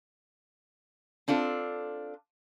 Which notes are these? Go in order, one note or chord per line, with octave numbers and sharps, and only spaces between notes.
C4 D4 F4 A4